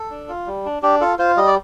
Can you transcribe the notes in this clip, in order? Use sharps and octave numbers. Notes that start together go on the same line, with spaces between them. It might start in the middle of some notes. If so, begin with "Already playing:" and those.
Already playing: A4
D4
F4
G3
D4
D4 G4
F4 A4
F4 C5
G3 D#5
D5